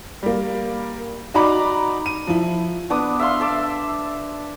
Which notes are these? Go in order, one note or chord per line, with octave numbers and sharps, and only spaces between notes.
G3 A#3
D#4 F#4 D5 A#5 B5 D6
D#7
F3 E4
B3 D4 D6 D#6
E5 F5 C6
E5 A5 D6